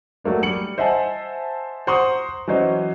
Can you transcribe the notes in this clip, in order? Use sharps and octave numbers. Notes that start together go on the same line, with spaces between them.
F#3 A3 A#3 D4
G3 C#7 F#7
C5 D#5 E5 F#5 G#5 A5
C5 F#5 A#5 C6 C#6 D#6
E3 F#3 C#4 C5 D#5